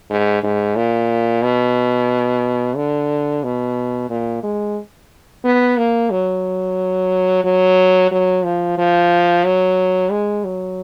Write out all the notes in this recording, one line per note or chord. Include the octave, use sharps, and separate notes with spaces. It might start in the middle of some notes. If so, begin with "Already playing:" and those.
G#2
G#2
A#2
B2
D3
B2
A#2
G#3
B3
A#3
F#3
F#3
F#3
F3
F3
F#3
G#3
F#3